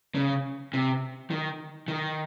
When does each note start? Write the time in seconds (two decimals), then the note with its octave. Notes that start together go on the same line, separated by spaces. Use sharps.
0.15 C#3
0.74 C3
1.30 D#3
1.88 D#3